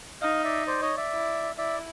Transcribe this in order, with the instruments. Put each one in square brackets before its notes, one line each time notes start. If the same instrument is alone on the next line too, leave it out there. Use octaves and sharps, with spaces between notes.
[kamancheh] D#4 [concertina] D#5 F5
[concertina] D5 E5
C5 D5
C#5 D#5
D5 E5
[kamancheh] E4
[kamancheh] E4 [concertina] D5 E5